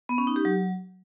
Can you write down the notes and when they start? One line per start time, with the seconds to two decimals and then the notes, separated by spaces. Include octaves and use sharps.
0.09 B3
0.18 C#4
0.27 D#4
0.36 G4
0.45 F#3